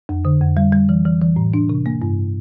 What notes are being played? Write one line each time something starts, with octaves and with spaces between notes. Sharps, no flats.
F2
D3
F2
G3
G3
E3
E3
E3
A2
D4
C3
A#3
G2